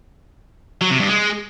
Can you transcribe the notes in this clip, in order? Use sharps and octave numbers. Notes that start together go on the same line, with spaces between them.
F#3
C3
G2
G#3